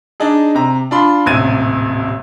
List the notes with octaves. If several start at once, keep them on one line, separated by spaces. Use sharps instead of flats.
D4 D#4 G#4
C3 A#5
D4 F4 B5 C6
D#1 A1 C3 G#6 A6 D#7